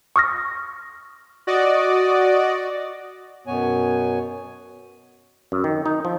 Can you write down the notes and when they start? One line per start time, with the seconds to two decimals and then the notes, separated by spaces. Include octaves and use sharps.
0.16 C#6 D#6 F6 A#6
1.47 F#4 D5 D#5
3.47 F#2 B2 B3 C#5 G#5
5.52 F#2
5.64 D#3
5.86 D#4
6.05 F3